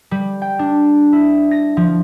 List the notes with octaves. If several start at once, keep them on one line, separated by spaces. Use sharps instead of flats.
G3
G5
D4
E4
A#6
F3